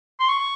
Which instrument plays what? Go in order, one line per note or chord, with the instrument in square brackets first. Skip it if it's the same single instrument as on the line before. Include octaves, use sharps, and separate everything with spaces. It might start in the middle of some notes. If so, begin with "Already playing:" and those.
[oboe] C6
C#6